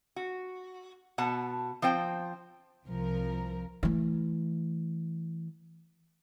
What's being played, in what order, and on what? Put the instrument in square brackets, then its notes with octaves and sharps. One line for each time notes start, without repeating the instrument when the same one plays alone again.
[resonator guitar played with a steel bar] F#4
B2 F#5 A5
F3 C4 C5 G5
[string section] C2 F3 A#4
[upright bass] E3 A3